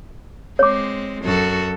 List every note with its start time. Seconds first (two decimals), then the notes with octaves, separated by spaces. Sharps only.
0.59 G#3 C4 C#5 D6
1.23 F#2 F#4 A4